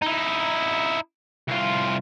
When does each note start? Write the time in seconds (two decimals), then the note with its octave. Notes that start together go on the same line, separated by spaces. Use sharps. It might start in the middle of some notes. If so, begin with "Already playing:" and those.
0.02 D#4 E4
1.48 C2 F4